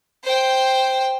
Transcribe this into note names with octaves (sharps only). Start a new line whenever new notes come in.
C5 G5